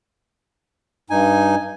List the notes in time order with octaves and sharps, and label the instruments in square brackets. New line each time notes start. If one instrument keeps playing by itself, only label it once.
[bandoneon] G2 D#4 G#5